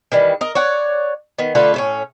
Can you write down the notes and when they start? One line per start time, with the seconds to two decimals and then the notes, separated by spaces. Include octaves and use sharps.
0.12 D#3 E3 G3
0.41 A#4 D#5
0.55 C#5 D5 F#5
1.39 D#3 B3
1.55 D3 A3 F4 B4
1.74 A2 A3 C#4